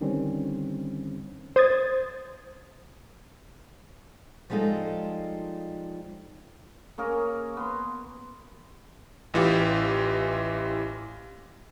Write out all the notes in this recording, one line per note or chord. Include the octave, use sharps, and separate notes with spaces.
D3 D#3 G3 C4 C#4
C5 D#6 G#6 A6
F3 G3 G#3 D#4 F4 A4
A#3 C#4 G#4 A#4
B3 C6
A1 E3 F4 G4